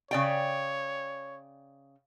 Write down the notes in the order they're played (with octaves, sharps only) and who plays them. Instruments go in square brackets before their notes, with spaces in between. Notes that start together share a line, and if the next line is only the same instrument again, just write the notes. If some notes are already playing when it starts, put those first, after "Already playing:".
[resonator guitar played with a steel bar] C#3 D5 G5 [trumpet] C#5